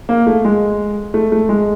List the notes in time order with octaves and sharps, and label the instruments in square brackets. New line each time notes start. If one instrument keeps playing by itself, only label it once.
[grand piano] A#3
A3
G#3
A3
A3
G#3